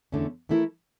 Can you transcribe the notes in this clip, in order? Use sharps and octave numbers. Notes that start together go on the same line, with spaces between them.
E2 D3 A3 C#4
E3 A3 E4 G4 A#4